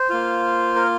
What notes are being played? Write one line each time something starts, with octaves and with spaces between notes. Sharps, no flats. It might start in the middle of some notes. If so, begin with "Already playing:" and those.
Already playing: C5
A#3 F4
A#4